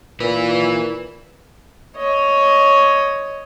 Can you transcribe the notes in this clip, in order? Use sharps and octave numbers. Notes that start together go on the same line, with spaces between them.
A#2 E4 B4
C#5 D#5